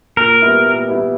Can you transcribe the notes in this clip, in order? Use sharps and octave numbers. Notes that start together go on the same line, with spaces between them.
A#2 A#4
G3 B3 E4
A#2
G3 B3 E4